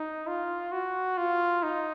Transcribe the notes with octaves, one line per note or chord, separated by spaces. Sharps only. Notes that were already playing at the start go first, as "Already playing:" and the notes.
Already playing: D#4
F4
F#4
F4
D#4